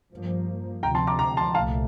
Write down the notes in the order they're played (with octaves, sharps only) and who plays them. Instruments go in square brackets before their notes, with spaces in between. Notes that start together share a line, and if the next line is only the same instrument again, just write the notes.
[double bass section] G2 F3 A#3
[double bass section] D2 C3 F3 [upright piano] G5 A#5
[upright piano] A5 C6
A#5 D6
A#5 D6
A5 C6
[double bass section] C2 A#2 A3 [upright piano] F5 A5